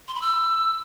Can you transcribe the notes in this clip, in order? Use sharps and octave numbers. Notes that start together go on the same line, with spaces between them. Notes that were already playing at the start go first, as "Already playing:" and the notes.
C6
B5
E6